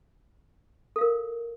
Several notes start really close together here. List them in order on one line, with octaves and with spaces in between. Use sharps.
A4 F5 A#4